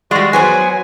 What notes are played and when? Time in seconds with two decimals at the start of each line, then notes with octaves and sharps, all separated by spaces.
0.11 G3 G#3 F#4 D5
0.33 F#3 B3 C5 G#5